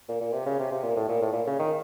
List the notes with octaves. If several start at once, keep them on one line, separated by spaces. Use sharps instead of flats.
A#2
A#2
C3
C#3
C3
C3
A#2
A2
A#2
A2
A#2
C#3
D#3